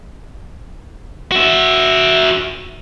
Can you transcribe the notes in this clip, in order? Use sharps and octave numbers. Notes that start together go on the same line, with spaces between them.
F#4 E5